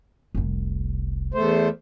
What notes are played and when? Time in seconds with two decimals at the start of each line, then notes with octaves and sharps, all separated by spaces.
0.35 F1 C2
1.34 E2 A3 C5